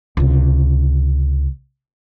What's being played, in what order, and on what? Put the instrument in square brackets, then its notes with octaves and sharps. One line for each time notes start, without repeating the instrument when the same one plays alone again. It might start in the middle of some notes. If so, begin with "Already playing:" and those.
[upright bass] C#2 C3